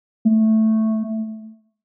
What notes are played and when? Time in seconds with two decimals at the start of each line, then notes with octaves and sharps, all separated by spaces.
0.25 A3